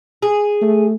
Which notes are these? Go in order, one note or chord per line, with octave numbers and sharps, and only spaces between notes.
G#4
A3